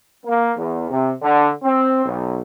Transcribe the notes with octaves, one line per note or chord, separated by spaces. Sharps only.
A#3
E2
C3
D3
C4
B1